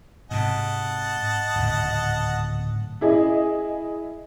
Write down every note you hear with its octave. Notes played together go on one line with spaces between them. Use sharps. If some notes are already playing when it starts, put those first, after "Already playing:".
G#2 C3 D#5 F#5 A5
D1 G#2 C#3
E4 G#4 D#5